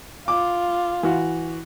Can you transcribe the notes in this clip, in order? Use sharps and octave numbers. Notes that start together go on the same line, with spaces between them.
F4 D6
E3 F#4